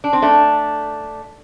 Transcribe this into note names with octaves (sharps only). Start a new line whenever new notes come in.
D4
C4
A3 D4